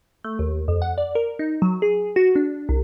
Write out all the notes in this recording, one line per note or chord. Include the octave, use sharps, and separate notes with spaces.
A3
D#2
F2
F#5
D5
A#4
D#4
F#3
G#4
F#4
D4
C2